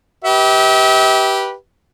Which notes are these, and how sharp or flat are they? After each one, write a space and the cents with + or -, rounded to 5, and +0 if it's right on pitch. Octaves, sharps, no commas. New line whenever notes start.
G4 -10 B4 -20 E5 -40